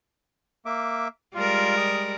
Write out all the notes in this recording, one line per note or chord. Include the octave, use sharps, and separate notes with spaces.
A#3 E5 D6
G3 G#3 F4 A#4
D#6